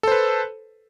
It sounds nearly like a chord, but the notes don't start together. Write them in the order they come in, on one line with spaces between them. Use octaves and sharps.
A4 C5 B4